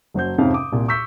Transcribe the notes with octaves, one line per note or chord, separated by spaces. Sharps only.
F#1 F#3 C5 G6
F2 G#2 C3 F3 C#4 F5
D6 D#6
C2 A#2
C#6 E6 G6 B6